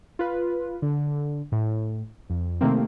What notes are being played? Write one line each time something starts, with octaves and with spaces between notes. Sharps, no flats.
F4 B4
D3
A2
F2
C3 D#3 A3 A#3 C4